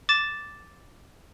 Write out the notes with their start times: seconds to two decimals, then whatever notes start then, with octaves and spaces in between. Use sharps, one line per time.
0.09 D6 A6 E7